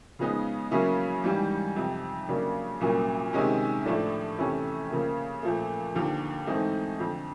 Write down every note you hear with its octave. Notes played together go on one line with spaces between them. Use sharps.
C#3 F3 G#3 B3 D#4
C#3 F#3 A#3 C#4 E4
G#2 E3 G3
F2 C3 F3
C#3 F#3 A#3 D4
C2 A#2 F#3 A#3 C#4
C3 D#3 G#3 C#4
A2 F3 A3 D4
F2 C3 E3 A3 C#4
C#3 F3 A#3
A#2 F3 A3
D#2 D3 F3
G#2 E3 A3 C4 D#4
F2 D3 F3